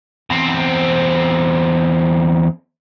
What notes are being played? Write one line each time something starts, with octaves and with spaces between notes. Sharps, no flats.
E2 C4